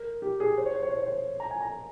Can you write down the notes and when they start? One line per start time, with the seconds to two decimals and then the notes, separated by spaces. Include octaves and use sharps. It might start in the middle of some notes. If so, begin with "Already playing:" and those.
Already playing: A#4
0.22 G4
0.40 G#4
0.58 C5
0.66 C#5
0.74 C5
0.83 C#5
0.90 C5
0.98 C#5
1.06 C5
1.40 A#5
1.51 G#5
1.61 A#5